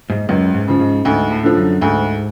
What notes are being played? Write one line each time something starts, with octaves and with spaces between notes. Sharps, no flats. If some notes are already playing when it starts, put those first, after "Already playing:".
G#2
C#2 F#2
G#2
C#3 F3
G#2
D2 G#2
A2
D3 F3
F#2
D2 G#2